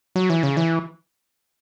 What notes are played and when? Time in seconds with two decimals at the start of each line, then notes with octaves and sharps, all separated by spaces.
0.16 F#3
0.30 E3
0.43 C#3
0.57 E3